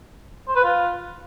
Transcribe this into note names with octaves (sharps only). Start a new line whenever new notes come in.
C5
B4
F4